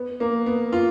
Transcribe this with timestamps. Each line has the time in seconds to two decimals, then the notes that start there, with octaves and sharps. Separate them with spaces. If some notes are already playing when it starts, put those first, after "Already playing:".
Already playing: B3
0.20 A#3
0.46 B3
0.73 F4